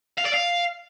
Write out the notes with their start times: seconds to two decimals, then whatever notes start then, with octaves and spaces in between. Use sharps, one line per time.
0.18 F5
0.26 D5
0.34 F5